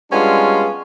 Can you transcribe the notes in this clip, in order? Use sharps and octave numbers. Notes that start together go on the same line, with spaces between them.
G3 G#3 B3 C#4 D4 F4